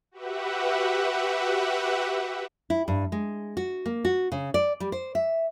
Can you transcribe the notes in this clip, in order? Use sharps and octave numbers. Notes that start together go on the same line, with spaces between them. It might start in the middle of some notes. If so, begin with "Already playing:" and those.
F#4 G4 B4 E5 F#5
E4
G2
G#3
F#4
A#3
F#4
C#3
D5
G3
C5
E5